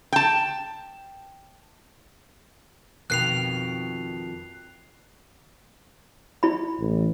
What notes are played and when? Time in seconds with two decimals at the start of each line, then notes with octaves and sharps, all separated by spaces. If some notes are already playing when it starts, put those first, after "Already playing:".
0.13 G5 A5
3.10 F2 B2 D#3 F#6 C7 F7
6.43 E4 B5
6.80 A1